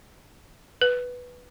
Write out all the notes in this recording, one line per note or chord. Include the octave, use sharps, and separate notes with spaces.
B4